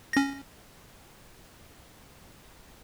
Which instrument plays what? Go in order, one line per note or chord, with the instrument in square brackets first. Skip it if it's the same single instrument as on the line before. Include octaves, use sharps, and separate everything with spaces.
[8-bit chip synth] C#4 A#6